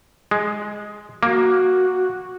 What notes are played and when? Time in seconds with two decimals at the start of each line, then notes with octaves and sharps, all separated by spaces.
0.31 G#3
1.23 A#3 F#4